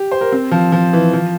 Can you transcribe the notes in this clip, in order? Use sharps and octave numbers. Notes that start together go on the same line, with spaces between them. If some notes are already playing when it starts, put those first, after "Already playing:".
Already playing: G4
C5
A#4
C4
F3
F3
E3
F3